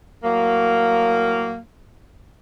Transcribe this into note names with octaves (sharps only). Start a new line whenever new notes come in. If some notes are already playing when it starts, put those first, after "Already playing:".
A2 F#3 A#3